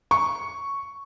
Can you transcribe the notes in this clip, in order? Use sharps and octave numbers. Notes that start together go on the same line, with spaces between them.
C#6